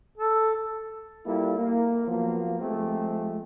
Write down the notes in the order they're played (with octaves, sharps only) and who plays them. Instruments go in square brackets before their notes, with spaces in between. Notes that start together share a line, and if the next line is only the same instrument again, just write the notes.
[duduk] A4
[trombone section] G3 A#3 E4 F4 A4
A#3
F3 F#3 A#3 B3
F3 G#3 A3 C4 G4